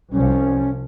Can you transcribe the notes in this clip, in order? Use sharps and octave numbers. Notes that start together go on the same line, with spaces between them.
C2 F3 C#4